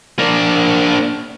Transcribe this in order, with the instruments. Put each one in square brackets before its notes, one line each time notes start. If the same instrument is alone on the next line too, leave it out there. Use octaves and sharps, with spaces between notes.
[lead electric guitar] A#3 D4